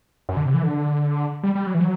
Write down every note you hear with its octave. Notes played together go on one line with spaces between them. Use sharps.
F#2
D3
C3
E3
D3
G3
G3
F#3
E3
F#3